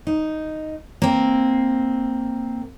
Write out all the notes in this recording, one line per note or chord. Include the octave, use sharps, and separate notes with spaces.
D#4
A#3 C4